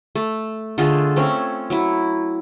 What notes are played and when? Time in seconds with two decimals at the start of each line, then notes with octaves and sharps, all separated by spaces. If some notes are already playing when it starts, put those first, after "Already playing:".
0.15 A3
0.78 D3 A3 F4 G#4
1.16 A3 C4 C#4
1.70 F#3 E4